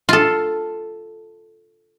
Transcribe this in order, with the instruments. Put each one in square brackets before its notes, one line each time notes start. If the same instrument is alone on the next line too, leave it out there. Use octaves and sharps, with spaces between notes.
[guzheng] F4 A4